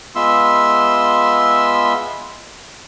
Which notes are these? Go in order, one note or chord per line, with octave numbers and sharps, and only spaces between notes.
G#3 B3 F4 E5 C6 E6